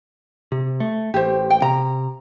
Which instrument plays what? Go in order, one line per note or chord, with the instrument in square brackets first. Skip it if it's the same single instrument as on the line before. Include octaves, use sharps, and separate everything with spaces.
[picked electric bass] C3
A3
[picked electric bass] A1 [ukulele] G4 C5
[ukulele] G5
[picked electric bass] C3 [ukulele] A#5